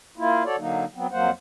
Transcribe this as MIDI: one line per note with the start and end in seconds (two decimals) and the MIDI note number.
0.18 0.43 58
0.18 0.43 64
0.18 0.43 65
0.45 0.56 66
0.45 0.56 69
0.45 0.56 73
0.45 0.56 74
0.58 0.85 50
0.58 0.85 54
0.58 0.85 58
0.58 0.85 63
0.95 1.07 54
0.95 1.07 59
0.95 1.07 60
1.12 1.30 41
1.12 1.30 54
1.12 1.30 58
1.12 1.30 72
1.12 1.30 78